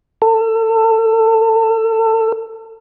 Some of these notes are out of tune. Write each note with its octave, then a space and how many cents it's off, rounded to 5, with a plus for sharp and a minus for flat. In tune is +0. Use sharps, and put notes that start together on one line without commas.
A4 +30